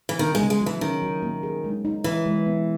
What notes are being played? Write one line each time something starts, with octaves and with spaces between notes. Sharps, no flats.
E3
D#3 B3
G#3
C#3
G#3
F#3
E3
D#3 C#4
F#3
A#3
G#4
G#3
D#4
E3 E4
G#3
B3